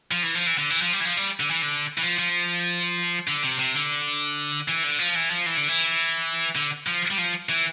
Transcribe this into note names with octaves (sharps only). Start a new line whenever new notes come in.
F3
E3
F3
E3
D3
E3
F3
G3
E3
F3
G3
D3
E3
D3
E3
F3
F3
D3
C3
C3
D3
E3
D3
F3
E3
F3
E3
D3
E3
D3
F3
G3
F3
E3